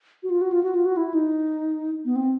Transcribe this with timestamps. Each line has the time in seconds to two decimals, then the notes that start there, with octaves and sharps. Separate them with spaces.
0.23 F#4
0.30 F4
0.41 F#4
0.52 F4
0.64 F#4
0.75 F4
0.85 F#4
0.97 E4
1.14 D#4
2.05 B3
2.16 C4